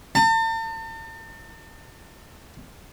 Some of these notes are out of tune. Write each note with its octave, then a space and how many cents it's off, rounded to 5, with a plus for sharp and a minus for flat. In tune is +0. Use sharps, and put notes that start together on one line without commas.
A5 +40